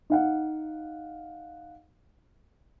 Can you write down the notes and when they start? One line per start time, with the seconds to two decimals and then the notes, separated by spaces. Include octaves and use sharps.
0.10 D#4 F5 F#5